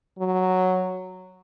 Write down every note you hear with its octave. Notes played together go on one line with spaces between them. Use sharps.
F#3